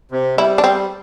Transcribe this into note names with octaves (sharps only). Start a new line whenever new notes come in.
C3
G3 E4
D4
G3 C4